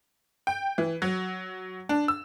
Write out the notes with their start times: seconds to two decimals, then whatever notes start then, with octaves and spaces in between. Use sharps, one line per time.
0.47 G5
0.78 E3
1.02 F#3
1.89 D4
2.08 E6